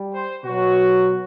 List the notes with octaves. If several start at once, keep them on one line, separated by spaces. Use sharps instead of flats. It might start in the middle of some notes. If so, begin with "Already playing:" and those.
Already playing: G3
C5
B2 F#3 F#4